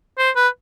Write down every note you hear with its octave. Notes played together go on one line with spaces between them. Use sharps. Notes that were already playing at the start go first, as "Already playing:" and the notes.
C5
B4